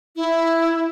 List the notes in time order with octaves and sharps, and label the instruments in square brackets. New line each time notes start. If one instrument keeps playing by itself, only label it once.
[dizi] E4